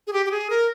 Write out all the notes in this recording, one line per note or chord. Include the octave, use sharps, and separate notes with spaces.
G#4
G4
G4
G#4
A#4